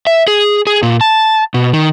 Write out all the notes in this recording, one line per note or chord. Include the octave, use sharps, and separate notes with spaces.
E5
G#4
G#4
A#2
A5
B2
D#3